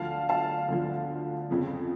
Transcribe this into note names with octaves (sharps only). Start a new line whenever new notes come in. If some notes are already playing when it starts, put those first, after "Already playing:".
Already playing: D2 D3 F3 F5 A5
F5 A5
D2 D3 F3
F2 C#3 F3